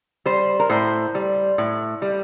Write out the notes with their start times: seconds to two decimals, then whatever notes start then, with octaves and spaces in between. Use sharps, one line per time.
0.26 G3 C5
0.60 A#4
0.69 A2 C5
1.15 G3
1.58 A2
2.02 G3